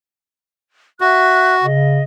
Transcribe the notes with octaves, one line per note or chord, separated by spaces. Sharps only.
F#4 E5 F#6
C#3 D#5